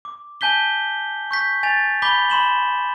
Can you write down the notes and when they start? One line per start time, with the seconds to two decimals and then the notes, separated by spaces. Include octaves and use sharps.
0.05 D6
0.41 G#5 A5 G6 B6 G7
1.31 C#6 G6 B6
1.63 G#5 A6 F7
2.02 B5 D6 G6 B6 G7
2.30 B5 C6 E7 F#7